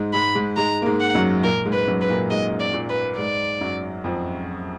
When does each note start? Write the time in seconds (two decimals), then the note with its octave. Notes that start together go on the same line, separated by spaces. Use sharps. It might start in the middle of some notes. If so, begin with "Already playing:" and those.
Already playing: G#2 G#3
0.13 G#2 G#3 B5
0.35 G#2 G#3
0.57 G#2 G#3 A#5
0.82 A#3
0.86 G#2 G#3
1.00 F#5
1.15 F#2 F#3
1.44 A#2 A#3 A#4
1.65 G#2 G#3
1.73 B4
1.88 F#2 F#3
2.02 B4
2.09 A#2 A#3
2.30 G#2 G#3 D#5
2.60 D5
2.74 A#2 A#3
2.90 B4
3.18 G#2 G#3 D5
3.61 F#2 F#3
4.04 F2 F3